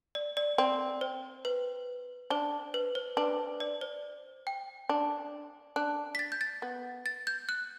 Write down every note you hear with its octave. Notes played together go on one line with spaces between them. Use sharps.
D5
D5
C4 D5
C5
B4
D4 C5
B4
C5
D4 B4
D5
C5
G5
D4
D4 F#6
B6
A6
G6
A6
B3
A6
G6
F#6